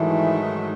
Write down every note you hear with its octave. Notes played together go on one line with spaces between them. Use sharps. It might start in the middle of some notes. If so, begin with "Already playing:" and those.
Already playing: G#2 D#3 E3 F#3 A3